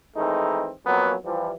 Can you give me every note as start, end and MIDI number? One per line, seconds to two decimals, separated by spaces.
0.17 0.71 51
0.17 0.71 52
0.17 0.71 56
0.17 0.71 57
0.17 0.71 60
0.17 0.71 63
0.86 1.14 41
0.86 1.14 54
0.86 1.14 58
0.86 1.14 59
0.86 1.14 61
1.25 1.53 52
1.25 1.53 53
1.25 1.53 55